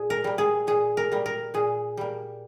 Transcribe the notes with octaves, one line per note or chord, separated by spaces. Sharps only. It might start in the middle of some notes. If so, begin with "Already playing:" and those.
Already playing: A#2 G#4
A#4
G3 A#3
G#4
A#2 G#4
A#4
G3 A#3
A#4
A#2 G#4
G3 A#3